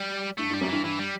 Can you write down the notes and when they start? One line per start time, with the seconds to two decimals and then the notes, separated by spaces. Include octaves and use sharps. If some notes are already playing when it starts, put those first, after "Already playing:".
Already playing: G3
0.38 G2 A3
0.50 G2
0.54 G3
0.61 F#2
0.69 G2 E3
0.84 G2 E3
0.99 G3